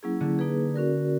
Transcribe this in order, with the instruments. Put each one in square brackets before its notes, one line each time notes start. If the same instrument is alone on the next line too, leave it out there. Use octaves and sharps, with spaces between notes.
[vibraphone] F#3 A#3 C#4 E4 G#4
[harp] D3
[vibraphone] A#3 D#4 G#4 B4
C#4 F#4 A#4 D5